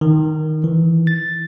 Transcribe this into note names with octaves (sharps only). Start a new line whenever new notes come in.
D#3
E3
A6